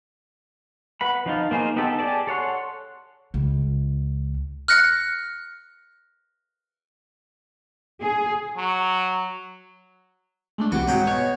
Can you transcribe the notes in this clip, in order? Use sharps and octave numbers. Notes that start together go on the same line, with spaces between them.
B4 F#5 B5
F3 D#4 F4
A#3 D#4 G#4 C5
B3 D#4 G4 A4
G4 G#4 D5 A5
A4 C#5 F#5 C6
C#2
F6 F#6 A#6 C#7
G#4
F#3
G#3 A3 D4
C2 C3 E3 F#4 G4
G#2 F#3 F#4 G#4 B4 G5 D#6
B2 C#5